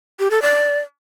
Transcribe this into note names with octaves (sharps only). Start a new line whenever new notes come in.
G4
A4
D5